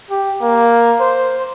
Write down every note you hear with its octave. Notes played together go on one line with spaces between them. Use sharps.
G4
A#3
C5